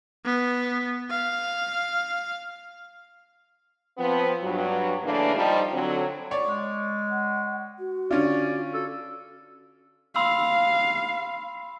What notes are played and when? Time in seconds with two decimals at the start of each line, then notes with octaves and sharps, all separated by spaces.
0.25 B3
1.10 F5
3.98 F3 B3 C4
4.42 G2 F#3
5.03 C#3 E3 A3 A#3 D4
5.36 F3 G3 D#4
5.73 D3 F#3 C4
6.31 C#5 D5
6.45 G#3
7.10 F#5
7.79 F#4
8.11 D3 C#4 F4 D5
8.74 F#4 A4
10.16 F5 B5 C6 E6